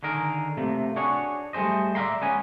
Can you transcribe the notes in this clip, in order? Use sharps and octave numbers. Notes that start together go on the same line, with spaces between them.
D3 D#3 G#4 A#4
C3 A3 A#3
D4 F#4 G#4 C#5
G3 A3 G#4 C5 D#5
D5 E5 F5 G#5 A#5 C6
G#3 B3 C#4 G#5